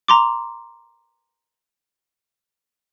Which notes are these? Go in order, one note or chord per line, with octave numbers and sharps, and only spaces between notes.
A#5 C6 D6